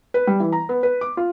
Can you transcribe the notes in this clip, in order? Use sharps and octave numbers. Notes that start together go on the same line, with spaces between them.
B4
G3
E3
A#5
B3
B4
D6
F4